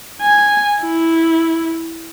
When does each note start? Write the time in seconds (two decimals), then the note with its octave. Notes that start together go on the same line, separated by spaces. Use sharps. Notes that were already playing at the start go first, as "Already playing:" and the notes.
0.22 G#5
0.83 E4